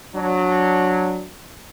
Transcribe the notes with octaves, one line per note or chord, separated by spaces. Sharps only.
F#3 D4